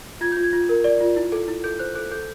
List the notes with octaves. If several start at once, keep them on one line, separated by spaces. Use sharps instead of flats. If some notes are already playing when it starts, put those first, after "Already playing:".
F4 G#6
F4 G6
G#6
F4
A#4
D5
F4
E4
A4
E4
A4 G6
C5 F#6
A4 F#6
A4 G6